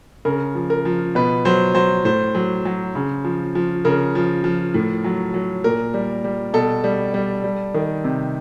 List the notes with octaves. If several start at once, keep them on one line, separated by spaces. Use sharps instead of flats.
C#3 A#4
F3
A#4
F3
B2 B4
F#3 C5
F#3 C5
A2 C5
F#3
F#3
C#3
F3
F3
C#3 A#4
F3
F3
A2
F#3
F#3
A#2 A#4
G3
G3
B2 A4
G3
G3
G3
D#3
C3